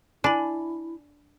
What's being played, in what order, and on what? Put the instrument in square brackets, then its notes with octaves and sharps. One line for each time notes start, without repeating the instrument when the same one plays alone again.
[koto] D4 [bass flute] E4 [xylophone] G#5 B5 F#7